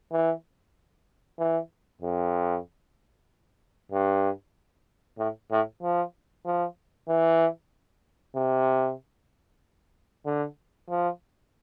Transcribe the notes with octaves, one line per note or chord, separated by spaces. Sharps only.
E3
E3
F2
G2
A2
A2
F3
F3
E3
C3
D3
F3